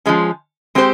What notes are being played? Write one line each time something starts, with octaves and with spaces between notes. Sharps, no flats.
F3 G#3 C#4
G#3 C4 G4 C5